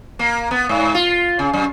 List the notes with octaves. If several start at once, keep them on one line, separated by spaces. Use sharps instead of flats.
A#3
B3
G#2
F4
C#3
F#2